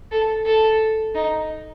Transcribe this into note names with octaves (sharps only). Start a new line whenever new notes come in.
A4
A4
D#4